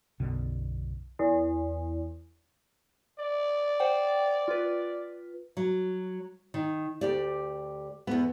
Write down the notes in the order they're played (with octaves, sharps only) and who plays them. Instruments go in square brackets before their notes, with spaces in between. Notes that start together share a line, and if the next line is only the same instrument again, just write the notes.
[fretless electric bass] B1 F#2 B2 D3
[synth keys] E2
[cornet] D5
[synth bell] C5 F#5 G5
F4 B4
[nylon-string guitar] F#3
D#3
D2 G4 D5
E2 B3